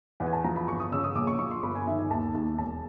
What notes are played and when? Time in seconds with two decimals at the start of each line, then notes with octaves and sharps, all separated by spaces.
0.20 E2 F#5
0.27 G#5
0.33 A5
0.44 F3 A#5
0.56 B5
0.68 G1 C#6
0.80 D#6
0.92 C#3 E6
1.04 D#6
1.15 A#1 D6
1.27 C#6
1.39 F3 C#6
1.51 C6
1.63 G1 B5
1.75 G#5
1.87 D#3 E5
1.99 G#5
2.10 D#2 A5
2.34 D#2
2.58 E1 A5